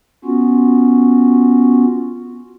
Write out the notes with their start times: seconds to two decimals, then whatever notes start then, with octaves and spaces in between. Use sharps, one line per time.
0.25 B3 C#4 F4 F#4